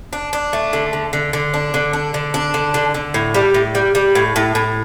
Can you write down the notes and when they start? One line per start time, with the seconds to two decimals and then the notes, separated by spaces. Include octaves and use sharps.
0.13 D4
0.33 D4
0.53 A3
0.73 D3
0.93 D3
1.13 D3
1.33 D3
1.54 D4
1.74 D3
1.93 D4
2.14 D3
2.34 D4
2.54 D3
2.74 D3
2.94 D3
3.14 A2
3.34 G3
3.54 A2
3.75 G3
3.95 G3
4.15 A2
4.36 A2
4.55 A2